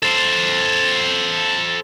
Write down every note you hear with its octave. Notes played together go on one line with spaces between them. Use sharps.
A4 C5